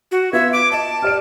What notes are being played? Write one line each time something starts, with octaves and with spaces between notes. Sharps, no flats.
F#4
B3 F4 E5 G#6
D6 D7
D#5 A5
G4 D5 F6 D7